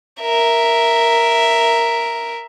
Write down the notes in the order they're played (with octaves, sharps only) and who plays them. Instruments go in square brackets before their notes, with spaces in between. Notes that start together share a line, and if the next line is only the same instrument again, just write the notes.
[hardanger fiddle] A#4 E5